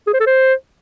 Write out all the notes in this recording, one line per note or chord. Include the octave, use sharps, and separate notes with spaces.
G#4
C5
A4
C5